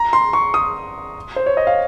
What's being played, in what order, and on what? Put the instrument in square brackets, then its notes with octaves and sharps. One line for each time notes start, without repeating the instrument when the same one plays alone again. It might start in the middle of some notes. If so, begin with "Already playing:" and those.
Already playing: [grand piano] A#5
C6
C#6
D#6
C5
C#5
D#5
F5